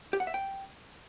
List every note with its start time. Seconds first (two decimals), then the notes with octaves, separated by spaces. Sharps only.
0.13 G4
0.20 F#5
0.27 E5
0.34 G5